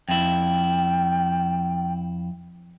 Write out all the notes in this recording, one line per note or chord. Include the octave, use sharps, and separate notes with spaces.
F2 E4 G5